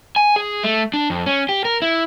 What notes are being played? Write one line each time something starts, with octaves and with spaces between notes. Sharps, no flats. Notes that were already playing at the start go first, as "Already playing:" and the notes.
G#5
G#4
A3
D4
F2
C#4
G4
A#4
E4